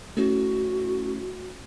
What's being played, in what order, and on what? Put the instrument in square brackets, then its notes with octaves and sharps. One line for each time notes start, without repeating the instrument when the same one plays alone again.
[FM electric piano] A3 C#4 E4 [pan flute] F#4